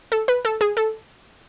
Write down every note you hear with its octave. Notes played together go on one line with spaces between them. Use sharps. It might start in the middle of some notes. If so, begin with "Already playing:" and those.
A4
B4
A4
G#4
A4